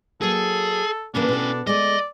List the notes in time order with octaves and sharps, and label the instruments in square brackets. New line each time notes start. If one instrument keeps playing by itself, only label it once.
[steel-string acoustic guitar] F#3 A#3 [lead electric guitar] G#4 [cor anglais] A4
[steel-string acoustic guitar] C#3 E3 A#3 [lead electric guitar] C#4 E4 [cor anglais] D4
[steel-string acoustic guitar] B2 A4
[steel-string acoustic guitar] G#3 A3 [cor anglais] D5 [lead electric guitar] D#5